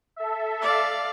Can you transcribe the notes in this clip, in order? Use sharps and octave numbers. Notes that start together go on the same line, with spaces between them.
A4 E5
D5 F5